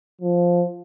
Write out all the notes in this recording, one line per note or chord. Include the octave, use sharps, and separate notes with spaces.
F3